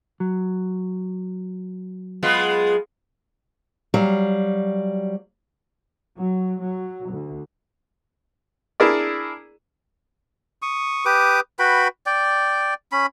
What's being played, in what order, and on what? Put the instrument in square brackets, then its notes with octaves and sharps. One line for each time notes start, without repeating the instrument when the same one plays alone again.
[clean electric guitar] F#3
[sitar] G#3 B3 F4
[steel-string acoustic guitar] F#3 G3 F5
[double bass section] F#3
F#3
D2
[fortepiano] D4 E4 G#4 A#4 D5
[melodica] C#6 D#6
G4 B4 D6 D#6
F#4 B4 G5 B5
D5 G5
C#4 B5